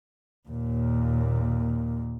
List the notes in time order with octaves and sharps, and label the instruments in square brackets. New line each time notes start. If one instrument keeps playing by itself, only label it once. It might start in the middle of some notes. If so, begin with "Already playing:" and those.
[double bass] D#2 A#2